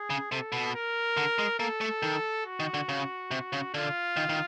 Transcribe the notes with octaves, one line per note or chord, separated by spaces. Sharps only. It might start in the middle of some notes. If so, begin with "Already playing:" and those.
Already playing: G#4
C#3
C3 A4
B2
A#4
D3
G#3
A#3 A4
A3
D#3
F#4
D#3
D3
C#3
C3
C#3
D3 F4
D#3
D#3